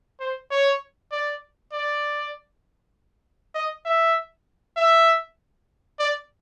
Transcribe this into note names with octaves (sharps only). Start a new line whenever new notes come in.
C5
C#5
D5
D5
D#5
E5
E5
D5